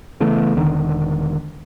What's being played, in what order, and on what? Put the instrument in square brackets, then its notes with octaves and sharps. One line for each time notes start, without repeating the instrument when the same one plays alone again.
[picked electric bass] C#3 E3 A3 B3
E1 D3 D#3